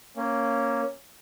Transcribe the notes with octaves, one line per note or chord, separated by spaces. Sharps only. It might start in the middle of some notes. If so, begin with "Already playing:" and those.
A#3 C#4